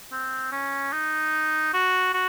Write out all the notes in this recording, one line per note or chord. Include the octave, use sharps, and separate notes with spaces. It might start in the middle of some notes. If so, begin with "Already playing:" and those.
C4
C#4
D#4
F#4
F#4